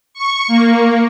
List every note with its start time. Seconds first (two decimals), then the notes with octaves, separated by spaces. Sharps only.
0.14 C#6
0.48 A#3